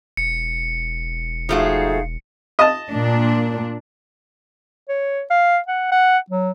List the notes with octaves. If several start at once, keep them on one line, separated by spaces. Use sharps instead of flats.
E1 C#7
F3 A3 D#4 F#4 G#4 F5
D#5 A5
A#2 D4
C#5
F5
F#5
F#5
F#3